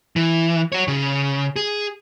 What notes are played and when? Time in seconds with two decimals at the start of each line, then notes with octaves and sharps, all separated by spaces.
0.16 E3
0.72 F#4 C#5
0.88 C#3
1.56 G#4